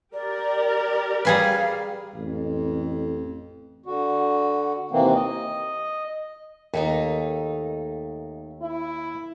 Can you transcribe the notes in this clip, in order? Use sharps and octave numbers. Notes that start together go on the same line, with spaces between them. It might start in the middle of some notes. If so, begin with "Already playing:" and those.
G4 A#4 D5
G3 G#4 B4 F5
A1 F2
D3 F#4
D#2 C3 E3 A#3 C4
D#5
D#2 A3 A#3 D#4
E4